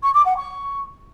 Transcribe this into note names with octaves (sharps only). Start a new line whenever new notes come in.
C#6
D6
F#5
C#6